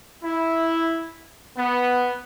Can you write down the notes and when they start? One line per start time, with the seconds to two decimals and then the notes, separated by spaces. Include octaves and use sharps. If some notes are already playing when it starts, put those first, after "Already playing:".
0.24 E4
1.57 B3